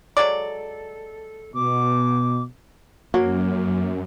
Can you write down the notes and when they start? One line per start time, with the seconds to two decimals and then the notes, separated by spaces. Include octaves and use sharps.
0.17 F#3 G#3 A4 D5
1.54 B2 D6
3.14 F#2 F#3 A#3